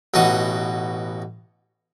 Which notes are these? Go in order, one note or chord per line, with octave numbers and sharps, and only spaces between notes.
A1 B2 D#4 F#4 D#6